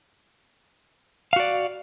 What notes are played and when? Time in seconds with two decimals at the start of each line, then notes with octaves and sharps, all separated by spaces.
1.33 F5
1.36 F#4
1.40 D5